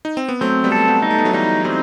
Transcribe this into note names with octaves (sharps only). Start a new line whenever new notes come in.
D#4
C4
B3
F#3 A3 C4
G3 B3
A3 A4
G3 B3
D#4
A3
B3
F#3 A3
E3 G3 D#4
E3 G3 C4